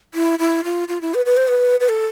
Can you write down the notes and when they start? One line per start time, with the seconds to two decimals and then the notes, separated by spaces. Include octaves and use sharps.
0.14 E4
0.39 E4
0.64 F4
0.88 F4
1.01 E4
1.14 B4
1.26 B4
1.37 C5
1.48 B4
1.80 B4
1.89 A4